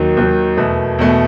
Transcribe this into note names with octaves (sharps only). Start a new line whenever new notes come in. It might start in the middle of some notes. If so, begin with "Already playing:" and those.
Already playing: D#2 D#3 F#3
D#2 D#3 F#3
E2 B2 A3
E2 B2 A3